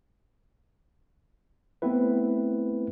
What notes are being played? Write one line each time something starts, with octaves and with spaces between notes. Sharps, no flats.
A3 B3 C4 E4 B4